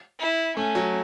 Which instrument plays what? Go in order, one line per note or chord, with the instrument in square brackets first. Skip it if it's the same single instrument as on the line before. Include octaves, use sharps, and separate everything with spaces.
[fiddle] E4
[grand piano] A3 [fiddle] C#4
[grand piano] F#3